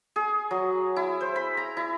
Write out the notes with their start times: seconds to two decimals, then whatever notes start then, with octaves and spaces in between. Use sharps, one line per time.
0.16 G#4
0.51 F#3
0.96 E4
1.21 C5
1.36 B5
1.57 A#5
1.77 E4